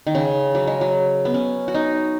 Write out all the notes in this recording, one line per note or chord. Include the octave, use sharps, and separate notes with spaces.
D#3
C#3
F#3
G#3
F#3
B3
C#4
F#4
D#4